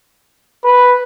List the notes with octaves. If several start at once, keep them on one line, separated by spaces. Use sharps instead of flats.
B4